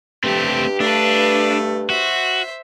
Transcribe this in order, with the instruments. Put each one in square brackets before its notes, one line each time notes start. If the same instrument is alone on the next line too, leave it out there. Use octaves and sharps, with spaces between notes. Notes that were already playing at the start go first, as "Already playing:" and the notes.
[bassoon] G2 [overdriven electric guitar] A3 C4 [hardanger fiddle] G4
[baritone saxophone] A3 [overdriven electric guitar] D4 [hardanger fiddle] B4 F5
[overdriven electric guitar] F#4 [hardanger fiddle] C5 E5